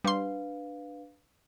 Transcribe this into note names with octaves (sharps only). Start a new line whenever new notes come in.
G3 D4 B4 F5 C6